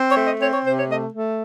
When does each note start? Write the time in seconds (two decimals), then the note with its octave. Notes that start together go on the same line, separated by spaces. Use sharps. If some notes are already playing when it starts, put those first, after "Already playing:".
Already playing: C4
0.09 C#5
0.16 A3
0.24 D#5
0.40 C4 C#5
0.52 C#5
0.64 C3 C5
0.76 C#5
0.88 A3 D#5
1.12 A3